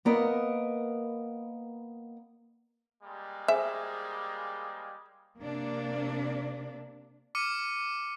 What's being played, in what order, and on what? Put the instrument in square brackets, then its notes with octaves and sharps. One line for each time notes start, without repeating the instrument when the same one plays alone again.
[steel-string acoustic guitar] A#3 B3 A#4 D#5
[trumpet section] G3 G#3 A#3
[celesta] G#4 C5 G#5 [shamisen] E5
[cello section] C3 A#3 D4
[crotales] D6 F6 C#7 D#7